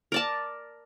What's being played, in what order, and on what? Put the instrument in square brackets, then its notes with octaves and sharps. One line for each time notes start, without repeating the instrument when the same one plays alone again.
[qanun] A#4 D5 A5